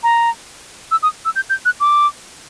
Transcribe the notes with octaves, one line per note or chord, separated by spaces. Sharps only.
A#5
E6
D#6
E6
G6
G6
F#6
D6